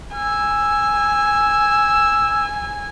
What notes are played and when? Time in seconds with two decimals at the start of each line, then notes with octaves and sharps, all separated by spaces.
0.16 G#5 E6